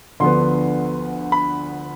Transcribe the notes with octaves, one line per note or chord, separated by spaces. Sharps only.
D2 D3 F3 B3 C6
B5